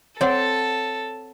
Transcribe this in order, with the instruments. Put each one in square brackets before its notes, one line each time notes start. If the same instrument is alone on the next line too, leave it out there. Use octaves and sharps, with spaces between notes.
[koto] C4 D5 [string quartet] A4 A5 [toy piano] C#5 F#5